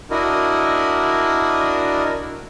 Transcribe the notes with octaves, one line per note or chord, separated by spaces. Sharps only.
D4 E4 F#4 A#4 D#5